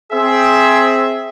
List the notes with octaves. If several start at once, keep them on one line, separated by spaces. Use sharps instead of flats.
C4 G#4 E5